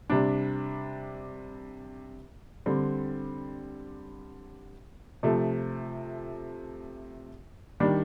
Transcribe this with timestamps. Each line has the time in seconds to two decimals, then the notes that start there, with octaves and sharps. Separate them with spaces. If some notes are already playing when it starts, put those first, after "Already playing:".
0.10 C3 G3 D4
2.66 D3 G3 C4
5.23 C3 F3 A3
7.80 D#3 G3 D4